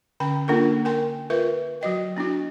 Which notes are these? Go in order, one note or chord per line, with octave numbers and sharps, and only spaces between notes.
D3 C#4 G5 A#5
A#3 D4 E4 F4 A4 A#4
A#4 G5 G#5 C6
F4 A#4 B4 E5 F5
F#3 F#4 D#5 G5
B3 D4 E4 F#4